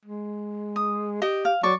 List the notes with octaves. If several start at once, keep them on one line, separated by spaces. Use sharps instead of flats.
G#3
D#6
G4 D#5
F5
F#3 D5 C#6